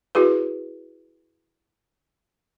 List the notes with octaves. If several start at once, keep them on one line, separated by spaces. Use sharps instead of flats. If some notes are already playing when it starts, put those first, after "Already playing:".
E4 F#4 G#4 B4